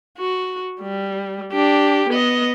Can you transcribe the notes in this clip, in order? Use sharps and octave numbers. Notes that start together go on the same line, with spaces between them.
F#4
G3
D4 G4
B3 D#5